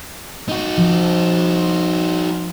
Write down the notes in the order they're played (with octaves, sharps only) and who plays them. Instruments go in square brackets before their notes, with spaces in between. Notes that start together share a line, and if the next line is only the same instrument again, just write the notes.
[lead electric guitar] D#4 F#4
[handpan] F3